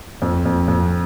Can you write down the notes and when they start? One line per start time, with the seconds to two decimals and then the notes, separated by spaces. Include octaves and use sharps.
0.22 F2
0.46 F2
0.68 F2